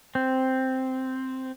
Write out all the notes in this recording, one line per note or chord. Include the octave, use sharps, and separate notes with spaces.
C4